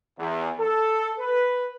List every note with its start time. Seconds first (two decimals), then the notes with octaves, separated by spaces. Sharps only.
0.19 E2
0.58 A4
1.19 B4